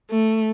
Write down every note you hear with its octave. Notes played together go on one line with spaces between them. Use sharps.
A3